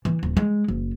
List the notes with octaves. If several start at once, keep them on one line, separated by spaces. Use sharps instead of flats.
E3
D#1
G#3
F#1